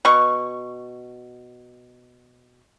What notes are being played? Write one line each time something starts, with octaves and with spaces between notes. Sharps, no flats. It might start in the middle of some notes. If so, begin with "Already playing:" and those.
B2 C#6